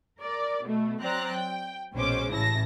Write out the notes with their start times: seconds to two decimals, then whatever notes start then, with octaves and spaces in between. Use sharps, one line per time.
0.20 A#4 D5
0.63 B2 A3
1.01 F#3 C4 D5 A#5 F#6
1.34 G5
1.93 A#1 B2 G#3 C#4 C5 D6
2.30 A1 C#3 E4 A5 A#6